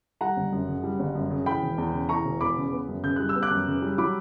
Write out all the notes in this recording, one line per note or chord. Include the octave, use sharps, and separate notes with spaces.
G3 F#5 A#5
G1
F#2
C#3
G3
G1
F#2
C#3
E3 G5 B5
E1
E2
C#3
E3 A#5 C#6
E1
E2 B5 D6
C#3
B3
F#2
C#3 G6
G3 F#6
E6
B3
D6 F#6
F#2
C#3
G3
F#3 B5 D6